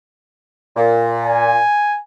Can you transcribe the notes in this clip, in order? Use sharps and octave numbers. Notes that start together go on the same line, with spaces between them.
A#2
G#5